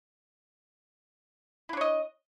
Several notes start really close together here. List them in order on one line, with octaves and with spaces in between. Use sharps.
E4 D4 C#5 D#5